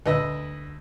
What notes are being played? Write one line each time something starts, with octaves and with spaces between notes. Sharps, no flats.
D2 B4 D#5 E6